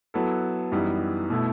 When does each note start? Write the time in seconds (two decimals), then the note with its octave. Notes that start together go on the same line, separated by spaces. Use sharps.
0.14 F#3 B3 E4 A4
0.72 F#2 E3 G3 B3 D#4
1.30 B2 A3 E4